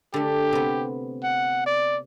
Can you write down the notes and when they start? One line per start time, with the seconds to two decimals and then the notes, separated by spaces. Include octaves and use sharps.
0.14 D3 A3 G4
0.53 C3 B3
1.23 F#5
1.66 D5